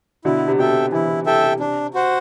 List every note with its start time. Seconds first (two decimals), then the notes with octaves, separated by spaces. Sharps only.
0.25 B2 D3 E4
0.48 C3
0.59 B2 A4 E5 G5
0.70 C3
0.92 C3 E3 E4
1.09 C3
1.26 C3 A4 E5 G5
1.44 C3
1.60 C3 D4
1.94 F#4 C5 F#5